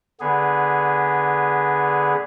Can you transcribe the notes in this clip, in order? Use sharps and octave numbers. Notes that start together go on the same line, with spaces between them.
D3 B3 G#4